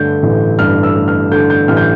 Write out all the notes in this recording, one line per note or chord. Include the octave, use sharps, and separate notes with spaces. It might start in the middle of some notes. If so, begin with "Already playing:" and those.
Already playing: G2 D3 A3 G6
A1
G2 F6
E6
A3
F6
D3 G6
G6
A1 F6
G6